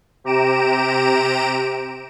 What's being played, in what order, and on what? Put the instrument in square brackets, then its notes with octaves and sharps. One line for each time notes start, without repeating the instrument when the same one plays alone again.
[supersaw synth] C3 G4 A#5 D7 E7